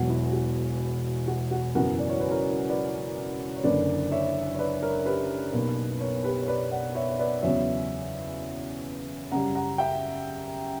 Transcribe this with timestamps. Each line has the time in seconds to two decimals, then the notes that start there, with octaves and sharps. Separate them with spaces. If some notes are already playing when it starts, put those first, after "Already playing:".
Already playing: E1 E2 B2 F#3 F#4
0.09 E4
0.33 F#4
1.28 F#4
1.51 F#4
1.75 F#1 F#2 E3 B3 F#4 A#4
1.99 D5
2.09 C#5
2.20 B4
2.30 A#4 C#5
2.69 B4 D5
3.56 C#5
3.64 F#1 F#2 D3 A#3 B4 D5
4.11 C#5 E5
4.54 C#5
4.59 B4 D5
4.83 A#4 C#5
5.06 G4 B4
5.53 B1 B2 A#3
6.00 A#4 C#5
6.24 G4 B4
6.42 C#5
6.48 B4 D5
6.71 D5 F#5
6.95 C#5 E5
7.10 C#5
7.19 B4 D5
7.42 E2 C#3 F#3 B3 C#5 E5
9.32 F#2 C#3 G3 F#5 A#5
9.55 F#5 A#5
9.78 E5 G5